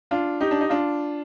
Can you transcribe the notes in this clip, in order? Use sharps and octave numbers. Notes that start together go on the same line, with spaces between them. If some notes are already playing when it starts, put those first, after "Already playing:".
D4 F4
D#4 G4
D4
D#4
D4 F4